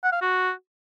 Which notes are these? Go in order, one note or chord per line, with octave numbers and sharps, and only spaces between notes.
F#5
F5
F#4